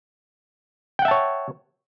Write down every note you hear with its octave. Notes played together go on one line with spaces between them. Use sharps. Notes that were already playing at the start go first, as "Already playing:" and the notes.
C#5 E5 F#5 G5 A5